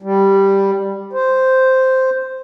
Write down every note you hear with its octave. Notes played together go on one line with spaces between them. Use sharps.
G3
C5